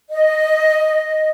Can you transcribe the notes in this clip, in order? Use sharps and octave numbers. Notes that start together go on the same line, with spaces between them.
D#5